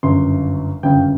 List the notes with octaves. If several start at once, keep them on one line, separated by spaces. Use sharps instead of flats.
G1 F#2 C#3 C6
G1 F#2 C#3 G5